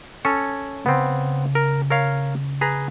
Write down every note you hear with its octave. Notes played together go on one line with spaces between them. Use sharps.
C#4 A4 C#5
C#3 B3 C4
A#4
A#4 C#5 F5
G#4 B4 A#5